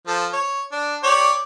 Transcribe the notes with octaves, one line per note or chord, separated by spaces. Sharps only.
F3 A4
C#5
D4
G4 C#5 D5